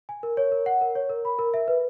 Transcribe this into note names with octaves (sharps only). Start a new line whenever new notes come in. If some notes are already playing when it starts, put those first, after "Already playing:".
G#5
A#4
C#5
A#4
F#5
A#4
C#5
A#4
B5
A#4
E5
B4